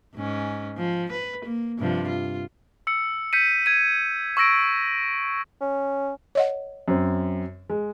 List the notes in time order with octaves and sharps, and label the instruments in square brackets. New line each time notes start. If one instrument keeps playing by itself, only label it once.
[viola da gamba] G#2 C#4
F3
B4
A#3
G2 C3 F3
F4
[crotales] E6 C#7
G6 B6 C#7 D#7
G#6 D#7
C#6 E6 A#6 D7
[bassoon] C#4
[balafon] C#5 D#5 F#5
[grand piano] F#2 C4
G#3